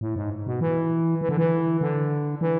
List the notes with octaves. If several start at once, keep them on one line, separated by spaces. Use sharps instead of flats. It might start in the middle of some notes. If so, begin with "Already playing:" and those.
A2
G#2
B2
E3
E3
D3
E3
D3
E3